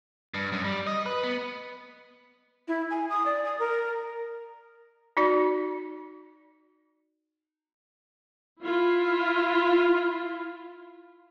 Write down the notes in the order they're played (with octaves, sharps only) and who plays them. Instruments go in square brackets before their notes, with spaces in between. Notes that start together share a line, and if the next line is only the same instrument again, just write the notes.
[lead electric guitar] G2
F#2
G3
D#5
B4
B3
[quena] E4
G#5
D#6
D5
D#6
A#4
[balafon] D#4 F#4 D5
[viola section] E4 F4